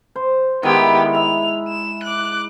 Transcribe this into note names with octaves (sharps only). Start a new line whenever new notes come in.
C5
D#3 G#3 B3 E4 G4
E5 F7
E7
D6 F#6